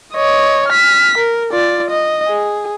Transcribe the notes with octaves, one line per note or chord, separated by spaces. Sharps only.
C#5 D#5
F6 B6
A#4
F4 D5
D#5
G#4